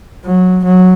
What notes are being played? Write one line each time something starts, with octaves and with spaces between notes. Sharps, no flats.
F#3
F#3